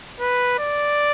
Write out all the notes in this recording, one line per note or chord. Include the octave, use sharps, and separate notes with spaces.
B4
D5